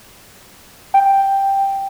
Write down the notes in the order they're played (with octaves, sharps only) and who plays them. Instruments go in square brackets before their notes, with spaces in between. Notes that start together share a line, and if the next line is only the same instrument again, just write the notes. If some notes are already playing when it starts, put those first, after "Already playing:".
[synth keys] G5